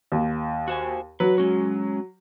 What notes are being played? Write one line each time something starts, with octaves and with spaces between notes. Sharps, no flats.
D#2
F#4 C5 G#5
F#3 B4
G#3 C#4 F#4